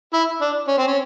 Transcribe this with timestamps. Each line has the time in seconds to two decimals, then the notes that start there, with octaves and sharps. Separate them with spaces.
0.14 E4
0.41 D4
0.68 C#4
0.78 C4
0.87 C#4